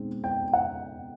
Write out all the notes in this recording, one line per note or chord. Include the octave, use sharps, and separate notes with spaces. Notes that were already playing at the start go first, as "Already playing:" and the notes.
Already playing: B2 G#3 C4 D#4
G5
F#5